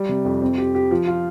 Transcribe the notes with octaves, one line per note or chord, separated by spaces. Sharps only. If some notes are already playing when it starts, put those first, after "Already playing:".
Already playing: G3
C3
F2
C4
G4
G4
F3
F4